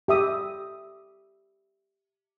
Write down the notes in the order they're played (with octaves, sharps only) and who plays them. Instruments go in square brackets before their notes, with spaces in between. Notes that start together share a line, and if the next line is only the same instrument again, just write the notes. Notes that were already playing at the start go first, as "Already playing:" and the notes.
[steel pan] G4 E5 D#6